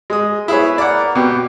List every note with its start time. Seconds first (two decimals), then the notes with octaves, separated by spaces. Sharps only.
0.10 G#3 D#6
0.48 B3 E4 G#4 C#5
0.78 A#3 D5 F#5
1.15 B2 G4